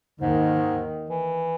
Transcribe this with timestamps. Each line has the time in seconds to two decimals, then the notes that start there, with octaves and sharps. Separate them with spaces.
0.21 D#2 G#2 D#3
1.10 E3